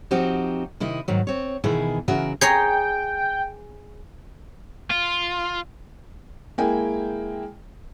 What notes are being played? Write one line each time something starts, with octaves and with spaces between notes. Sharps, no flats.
F3 C4 D#4 F#4 G4
C3 D#3 E4 D#5
G#2 D#3 F#3
C4 C#5
B2 D#3 E3 E4 G#4
C#3 E3 F#4 A#4 E5
G#4 C#5 G5 A#5
F4
G#3 A#3 E4 A#4 G5 G#5